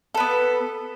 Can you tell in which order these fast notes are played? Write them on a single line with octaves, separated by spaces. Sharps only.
A4 B4 B3